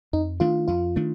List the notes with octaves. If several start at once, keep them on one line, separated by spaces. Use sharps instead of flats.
F2 D#4
D#3 A3 D4 F4
F2 F4
D#3 A3 D4